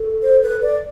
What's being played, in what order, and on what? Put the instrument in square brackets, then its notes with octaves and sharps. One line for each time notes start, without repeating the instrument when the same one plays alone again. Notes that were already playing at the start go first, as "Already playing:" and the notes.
Already playing: [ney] A4
[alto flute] C5
B4
D5